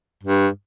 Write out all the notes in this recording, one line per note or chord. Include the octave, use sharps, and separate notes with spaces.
G2